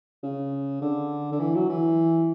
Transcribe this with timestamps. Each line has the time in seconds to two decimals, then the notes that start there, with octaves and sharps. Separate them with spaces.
0.23 C#3
0.82 D3
1.32 D3
1.40 E3
1.55 F#3
1.69 E3